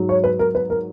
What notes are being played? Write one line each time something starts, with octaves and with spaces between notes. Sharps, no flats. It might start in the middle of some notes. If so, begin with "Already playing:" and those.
Already playing: G#2 F#3
C#5
B4
A#4
B4
A#4